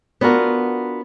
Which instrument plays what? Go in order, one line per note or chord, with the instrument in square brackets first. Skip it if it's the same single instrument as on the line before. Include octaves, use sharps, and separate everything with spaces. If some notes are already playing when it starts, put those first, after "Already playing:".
[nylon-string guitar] B3 D4 F4 F#4 A#4